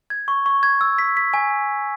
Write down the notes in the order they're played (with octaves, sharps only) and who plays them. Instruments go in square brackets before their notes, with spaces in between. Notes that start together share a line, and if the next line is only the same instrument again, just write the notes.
[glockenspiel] G#6
C#6
C#6
G#6
E6
B6
B6
G#5